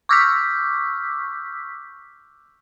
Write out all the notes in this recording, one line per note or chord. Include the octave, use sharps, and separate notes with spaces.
C#6 D6 E6 F6 G6 B6